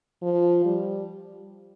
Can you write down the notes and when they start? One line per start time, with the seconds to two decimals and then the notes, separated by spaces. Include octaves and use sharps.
0.22 F3
0.65 G3